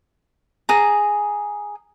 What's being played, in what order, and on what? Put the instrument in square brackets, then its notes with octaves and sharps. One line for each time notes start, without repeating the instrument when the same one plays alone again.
[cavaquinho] G#4 A#5